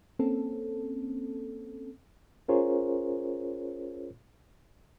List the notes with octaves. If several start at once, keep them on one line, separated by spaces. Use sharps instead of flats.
A#3 C4 C#4 A4
C#4 F4 G#4 A#4 C5 C#5